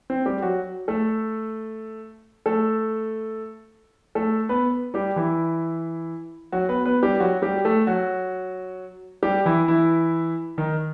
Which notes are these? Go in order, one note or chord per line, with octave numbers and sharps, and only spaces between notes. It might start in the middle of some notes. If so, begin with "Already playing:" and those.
C4
G3 G4
F#3 F#4
A3 A4
A3 A4
A3 A4
B3 B4
G3 G4
E3 E4
F#3 F#4
B3 B4
B3 B4
G3 G4
F#3 F#4
G3 G4
A3 A4
F#3 F#4
G3 G4
E3 E4
E3 E4
D#3 D#4